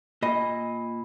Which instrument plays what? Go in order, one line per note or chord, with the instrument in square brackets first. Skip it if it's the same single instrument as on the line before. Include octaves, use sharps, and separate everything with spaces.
[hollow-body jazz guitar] A#2 D#5 [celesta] B5